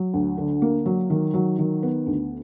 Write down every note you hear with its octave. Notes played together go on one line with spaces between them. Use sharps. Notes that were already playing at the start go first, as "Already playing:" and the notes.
Already playing: F#3
D2
D3
A#3
F#3
D#3
F#3
D#3
B3
D2